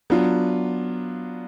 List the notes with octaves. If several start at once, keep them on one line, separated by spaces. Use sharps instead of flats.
F#3 B3 D4 F4